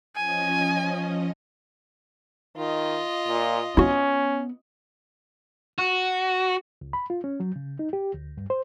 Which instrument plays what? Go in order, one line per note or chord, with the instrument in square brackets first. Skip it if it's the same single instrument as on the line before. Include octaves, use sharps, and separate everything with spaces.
[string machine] F3 C#4 D#5 [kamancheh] G#5
[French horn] D#3 [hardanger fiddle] F4 D#5
[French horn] A#2
[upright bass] B3 [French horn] C#4 [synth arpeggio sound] E4 F#4
[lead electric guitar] F#4
[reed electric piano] C#2
B5
F4
C#4
F#3
C#3
D#4
G4
D2
G2
C5